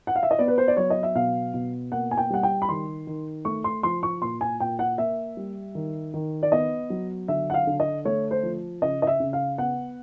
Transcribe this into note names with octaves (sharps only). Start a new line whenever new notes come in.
F#5
F5
E5
D#5
B3 D5
B4
C5
D5
F#3 C#5
D#5
E5
B2 F5
B2
A#3 F#5
G#5
G5
G3 F#5
G5
B5
D#3 C6
D#3
A3 C#6
C6
F3 C6
C#6
A#2 C6
G#5
A#2 G5
F#5
A#3 E5
G3
D#3
D#3
D5
B3 D#5
F#3
D3 E5
F#5
F5
D3
D#5
A3 C#5
C5
F3
C#3 D#5
D#5
E5
C#3
F5
B3 F#5